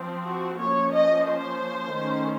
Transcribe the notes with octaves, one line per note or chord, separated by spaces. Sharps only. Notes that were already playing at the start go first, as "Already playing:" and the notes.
Already playing: F3 C4
F#4
F3 A#3 C#4 C#5
D#5
C5
D#3 A3 C#4